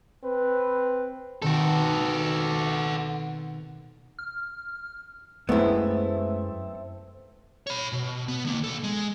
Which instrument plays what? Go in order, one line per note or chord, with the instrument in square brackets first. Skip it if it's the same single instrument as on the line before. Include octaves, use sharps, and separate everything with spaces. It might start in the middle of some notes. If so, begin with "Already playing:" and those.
[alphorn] C4 [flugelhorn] B4
[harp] B2 D#3 C4 [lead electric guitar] F#4 A4
[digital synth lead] F6
[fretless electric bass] F#2 G#3 [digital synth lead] A3 [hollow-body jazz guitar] B3 E4 [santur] C4 A4 E5
[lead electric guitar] C#5 B5
B2
B3
D3 A#3
B1 A4
G#3